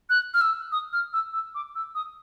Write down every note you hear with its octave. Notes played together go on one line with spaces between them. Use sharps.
F#6
F6
E6
D#6
F6
E6
E6
D6
E6
D#6